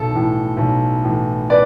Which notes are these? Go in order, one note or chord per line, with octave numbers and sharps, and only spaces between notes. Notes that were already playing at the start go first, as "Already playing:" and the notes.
Already playing: B1 A4
A2 E3
B1
A2 E3
B4 D5